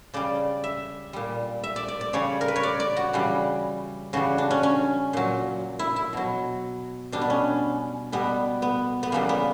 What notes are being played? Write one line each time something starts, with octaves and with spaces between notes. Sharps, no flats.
C#3 G3 D5
E5
A#2 G3
E5
D5
D5
D5
C#3 G3 C#5
A#4
B4
C#5
D5
D5
F#4
C#3 E3 G3
C#3 E3 G3 F#4
D4
C#4
C#4
A#2 F#3
E4
E4
B2 F#3
B2 G3 D4
B3
C#4
B2 G3 B3
B3
B3
C#3 E3 G3 A#3
B3